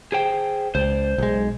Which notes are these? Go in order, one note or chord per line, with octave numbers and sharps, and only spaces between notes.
G#4 C5 G5
C#2 C5 D5
B1 G#3